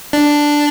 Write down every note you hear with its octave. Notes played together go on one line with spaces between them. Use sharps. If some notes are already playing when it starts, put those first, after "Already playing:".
D4